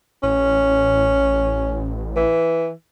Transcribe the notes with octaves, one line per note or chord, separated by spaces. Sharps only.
A1 C#4
E3